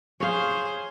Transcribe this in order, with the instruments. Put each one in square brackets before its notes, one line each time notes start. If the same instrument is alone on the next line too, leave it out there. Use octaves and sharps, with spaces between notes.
[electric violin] G#4 C5 [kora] C#5 F5